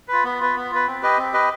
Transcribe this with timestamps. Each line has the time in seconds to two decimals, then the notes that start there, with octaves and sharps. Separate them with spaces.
0.08 F4 B4
0.24 B3
0.40 F4 B4
0.55 B3
0.71 F4 B4
0.87 C4
1.02 G4 B4 D#5
1.18 C4
1.33 G4 B4 D#5